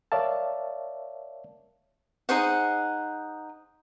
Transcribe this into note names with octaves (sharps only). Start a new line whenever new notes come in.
A#4 C#5 D5 E5 F5 A5
D#4 G#4 C5 F#5